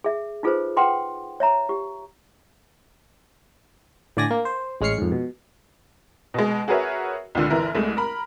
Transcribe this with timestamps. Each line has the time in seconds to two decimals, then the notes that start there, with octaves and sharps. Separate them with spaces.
0.04 G#4 E5
0.43 D#4 F4 G#4 A4 B4 C5
0.77 B4 F#5 G5 C6 D6
1.40 C#5 E5 A#5
1.69 G4
4.17 A2 D3 D5 G#5 A#6
4.31 A#3
4.45 C5
4.81 A1 G#3 C#4 F6 C7 C#7
4.98 F2 G#2
5.12 B2
6.34 B2 G#3
6.68 F#4 G#4 A#4 B4 C#5 E5
7.35 C#2 A#2 D3
7.50 G1 E3 A#4 E5
7.75 C2 G#3 A3
7.97 A#4 B5